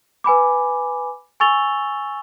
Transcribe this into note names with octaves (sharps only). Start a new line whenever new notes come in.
B4 G#5 B5 D6
G#5 C#6 E6 A6 F7 G7